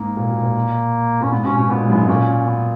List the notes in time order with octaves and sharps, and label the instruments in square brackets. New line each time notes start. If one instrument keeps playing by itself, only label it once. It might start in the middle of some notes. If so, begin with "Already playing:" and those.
Already playing: [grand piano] G#2 [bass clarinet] A#3
[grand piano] A#2
B2
A#2
[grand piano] A#2 [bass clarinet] C#4
[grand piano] G#2 [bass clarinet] B3
[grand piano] B2 [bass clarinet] C#4
[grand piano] B2 [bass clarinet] C#4
[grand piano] A#2 [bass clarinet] B3
[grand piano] G#2
[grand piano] F#2 [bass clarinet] B3
[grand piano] G#2
[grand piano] A#2 [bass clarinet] C#4
[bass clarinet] C#4
B3